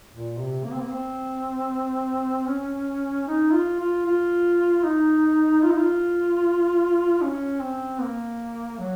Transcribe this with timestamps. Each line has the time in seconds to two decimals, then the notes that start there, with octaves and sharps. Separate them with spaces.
0.11 A#2
0.38 C3
0.64 A#3
0.72 C4
0.80 A#3
0.90 C4
2.48 C#4
3.27 D#4
3.53 F4
3.80 F4
4.06 F4
4.84 D#4
5.63 F4
5.71 D#4
5.79 F4
7.22 C#4
7.61 C4
8.01 A#3
8.78 F#3